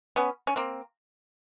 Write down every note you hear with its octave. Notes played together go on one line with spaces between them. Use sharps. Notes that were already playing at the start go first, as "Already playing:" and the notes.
B3 C#4
C#4
A#3 C4